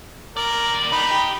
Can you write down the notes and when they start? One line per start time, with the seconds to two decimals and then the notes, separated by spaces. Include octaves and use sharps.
0.37 D#2 A#4 D5
0.92 D#4 G4 B4 B5
1.11 G4